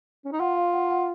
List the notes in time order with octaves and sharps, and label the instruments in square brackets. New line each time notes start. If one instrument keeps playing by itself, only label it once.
[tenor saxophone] C#4
D#4
[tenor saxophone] F4 [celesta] F#5
[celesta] F5
F#5
F#5